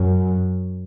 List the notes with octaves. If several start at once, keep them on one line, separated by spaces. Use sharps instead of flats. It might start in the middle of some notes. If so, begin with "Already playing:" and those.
Already playing: F#2